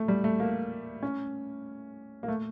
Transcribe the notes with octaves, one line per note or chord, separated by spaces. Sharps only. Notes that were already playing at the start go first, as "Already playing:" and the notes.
Already playing: A3
G3
A3
A#3
C#4
A#3
A3